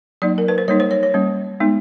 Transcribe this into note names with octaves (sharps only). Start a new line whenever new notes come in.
F#3 A#3 D#4 D5
A#4
B4
C5
G3 A#3 D#4 C#5
C5
C#5
C#5
G3 A#3 C#4
G#3 B3 D#4